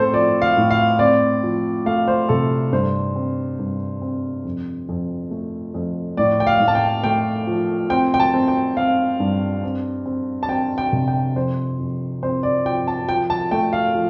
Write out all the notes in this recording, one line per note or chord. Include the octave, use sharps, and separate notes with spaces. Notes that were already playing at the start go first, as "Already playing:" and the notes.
Already playing: A2 C4 A4 C5
F3 D5
F5
A2
F5
C4 D5
F3
A3 F5
C5
C3 A4
G2 C5
C4
G2
C4
F2
F2
A3
F2
A2 D5
G5
F5
A2
A5
G5
A3 G5
F3
C4 G5
G5
A5
C4
G5
C4 F5
G2
C4
C4
A5
C4 G5
G5
C3
G5
F2 C5
F2
C4 C5
D5
F3 G5
A5
F3 G5
A5
A3 G5
F5
F3